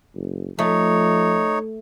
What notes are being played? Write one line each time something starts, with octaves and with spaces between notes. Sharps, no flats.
F#1
F3 A3 D#4 C#5